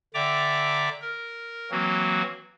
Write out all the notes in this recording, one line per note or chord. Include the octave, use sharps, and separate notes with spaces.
D3 D5 E5 G5 A#5 D6
A#4
E3 F#3 A#3 C4 F#4